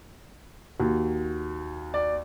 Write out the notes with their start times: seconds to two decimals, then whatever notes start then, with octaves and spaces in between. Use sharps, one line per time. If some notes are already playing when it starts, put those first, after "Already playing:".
0.80 D#2 F#4
1.94 D5